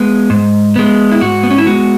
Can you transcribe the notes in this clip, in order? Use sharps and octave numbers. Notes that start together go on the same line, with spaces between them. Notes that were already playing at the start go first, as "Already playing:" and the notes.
Already playing: G#3 B3 G#4
G#2
G#3 B3
E4
G#2 F#4
B3
C#4
E4
G#3 B3 F#4